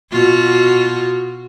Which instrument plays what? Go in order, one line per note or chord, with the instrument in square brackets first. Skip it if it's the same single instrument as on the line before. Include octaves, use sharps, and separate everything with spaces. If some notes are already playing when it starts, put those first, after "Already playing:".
[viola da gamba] B2 F4 F#4